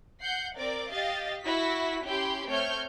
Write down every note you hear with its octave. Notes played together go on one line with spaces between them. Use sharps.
F#5 G6 C7
C4 A#4 D5 D6
G4 D#5 F5 A6
E4 F#4 B6
C#4 E4 G4 G5 B5 C6
A3 C4 C#5 F6 G6